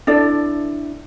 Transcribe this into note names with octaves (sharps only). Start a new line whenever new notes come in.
D4 E4 A4 D5